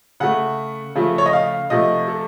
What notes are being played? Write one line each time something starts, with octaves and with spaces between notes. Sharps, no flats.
C#3 A3 F#5
C#3 F3 A3
C#5
D#5
F5
C3 F3 A3 D#5
A4